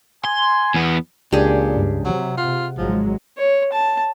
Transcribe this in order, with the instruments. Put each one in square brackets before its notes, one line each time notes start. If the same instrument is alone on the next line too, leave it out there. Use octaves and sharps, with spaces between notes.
[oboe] G#5 [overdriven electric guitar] C6
[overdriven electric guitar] E2 B3
[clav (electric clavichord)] C#2 D4 [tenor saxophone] A#2 [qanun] G4 G#4
[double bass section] G2
[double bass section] C3 [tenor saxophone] F#3
[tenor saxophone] F4 [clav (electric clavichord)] F#5
[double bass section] G#1 F#3 G#3 [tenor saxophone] F3
[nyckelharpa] C#5
A5